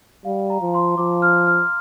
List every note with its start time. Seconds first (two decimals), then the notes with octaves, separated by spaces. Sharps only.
0.25 G3 F5
0.50 A#5
0.61 F3
0.74 C6
0.97 F3 D6
1.22 F6
1.47 F6